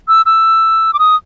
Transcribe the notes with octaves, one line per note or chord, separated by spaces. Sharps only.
E6
E6
D6
D#6